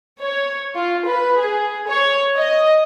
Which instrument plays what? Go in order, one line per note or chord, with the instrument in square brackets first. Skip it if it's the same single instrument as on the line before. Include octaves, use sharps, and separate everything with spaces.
[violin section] C#5
F4
B4
G#4
C#5
D#5